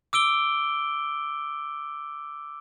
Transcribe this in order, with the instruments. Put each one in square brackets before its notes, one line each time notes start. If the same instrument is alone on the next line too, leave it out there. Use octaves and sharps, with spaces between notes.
[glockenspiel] D6 E6 D7 G7